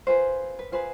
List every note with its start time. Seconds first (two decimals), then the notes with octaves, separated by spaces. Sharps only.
0.07 F4 G#4 B4 C5
0.59 B4
0.72 F4 G#4 B4 C5